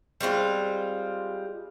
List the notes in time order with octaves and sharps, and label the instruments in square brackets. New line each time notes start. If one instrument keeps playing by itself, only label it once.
[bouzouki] G3 G#3 C4 F4